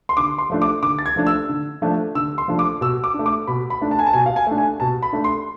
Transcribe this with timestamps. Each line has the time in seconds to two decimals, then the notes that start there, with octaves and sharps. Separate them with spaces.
0.09 C6
0.17 D3 D6
0.38 C6
0.50 F3 A3 D4
0.62 D6
0.82 D3 D6
0.99 A6
1.06 G#6
1.16 F3 A3 D4
1.27 E6
1.49 D3
1.82 F3 A3 D4
2.15 D3 E6
2.38 C6
2.48 F3 A3 D4
2.59 D6
2.81 B2 E6
3.04 D6
3.14 D4
3.19 A3
3.26 D6
3.47 B2 B5
3.70 B5
3.81 A3 D4
3.91 A5
3.99 G#5
4.06 A5
4.13 B2 G#5
4.26 F5
4.36 G#5
4.47 A3 D4
4.58 G#5
4.80 B2 A5
5.03 B5
5.13 A3 D4
5.24 C6